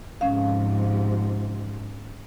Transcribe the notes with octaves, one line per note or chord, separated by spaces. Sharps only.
G#2 C3 F3 C#4 F5